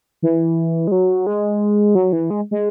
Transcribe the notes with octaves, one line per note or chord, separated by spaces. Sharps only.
E3
G#3
F#3
G#3
F#3
E3
G#3
G#3